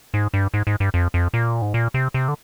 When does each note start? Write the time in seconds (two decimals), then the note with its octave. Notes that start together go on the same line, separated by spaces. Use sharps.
0.14 G#2
0.34 G2
0.54 G#2
0.67 G#2
0.80 G2
0.94 F2
1.14 F2
1.34 A#2
1.62 G#2
1.74 A#2
1.94 C3
2.14 C3
2.28 D3